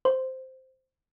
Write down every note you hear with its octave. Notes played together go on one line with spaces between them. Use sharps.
C5